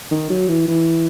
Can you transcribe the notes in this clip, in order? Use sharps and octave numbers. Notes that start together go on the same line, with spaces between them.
D#3
F#3
E3
E3